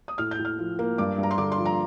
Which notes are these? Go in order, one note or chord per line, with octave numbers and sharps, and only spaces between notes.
D#6
A2 F6
G6
A2
F6
F3
A#3
G2 D6
G2 A#5
C6
D3 D6
C6
F3
A#5